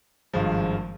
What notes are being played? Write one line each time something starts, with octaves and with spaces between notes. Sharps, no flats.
G#1 G2 F3 G#3